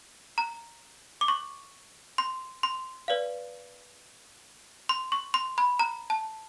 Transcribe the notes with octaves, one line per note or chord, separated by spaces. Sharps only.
A#5
D6
C#6
C6
C6
B4 D5 F5
C6
C#6
C6
B5
A#5
A5